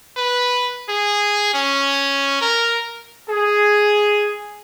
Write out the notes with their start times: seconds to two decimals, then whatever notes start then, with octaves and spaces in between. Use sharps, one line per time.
0.17 B4
0.89 G#4
1.54 C#4
2.41 A#4
3.29 G#4